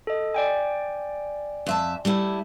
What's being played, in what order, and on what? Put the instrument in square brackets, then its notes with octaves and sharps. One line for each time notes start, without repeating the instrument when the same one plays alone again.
[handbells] A4 D#5
D5 G5 G#5
[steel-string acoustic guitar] F2 E5 A5
G3 A3 E4